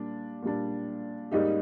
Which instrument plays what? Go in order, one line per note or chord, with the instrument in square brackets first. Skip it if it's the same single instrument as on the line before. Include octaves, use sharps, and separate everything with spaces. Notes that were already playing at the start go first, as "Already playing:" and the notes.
Already playing: [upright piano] A#2 G3 D4
A#2 G3 D4
G#2 G3 A#3 D#4 G4